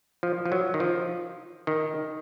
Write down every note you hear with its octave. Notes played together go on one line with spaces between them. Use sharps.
F3
F3
F#3
D#3
F3
D#3